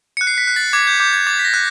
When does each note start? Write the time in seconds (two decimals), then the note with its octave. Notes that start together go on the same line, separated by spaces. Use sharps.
0.17 F#6 C#7
0.27 C7
0.38 B6
0.47 F#6
0.56 A6
0.73 D6 G#6
0.87 G6
1.00 D6 G6
1.13 G#6
1.27 D6 A6
1.39 B6
1.45 A#6
1.54 F#6